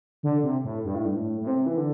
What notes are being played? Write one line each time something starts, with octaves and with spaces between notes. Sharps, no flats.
D3
C3
A2
G2
A2
G2
A2
A2
C3
E3
D3